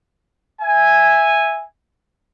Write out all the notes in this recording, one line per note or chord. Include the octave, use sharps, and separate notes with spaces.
E5 G#5